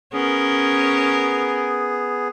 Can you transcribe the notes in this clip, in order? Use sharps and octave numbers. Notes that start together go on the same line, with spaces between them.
B3 C#4 G#4 A#4